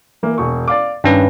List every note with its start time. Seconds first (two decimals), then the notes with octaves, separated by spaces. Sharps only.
0.23 E3 A#3
0.38 E1 C#6
0.68 D5 F5 D6
1.04 G2 D#3 C#4 D4 B4